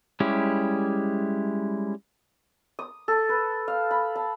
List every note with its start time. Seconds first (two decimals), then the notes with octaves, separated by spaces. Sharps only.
0.20 G3 G#3 C#4 E4 G4
2.79 D#6
3.08 A4
3.29 B4
3.68 F5
3.91 B5
4.15 A5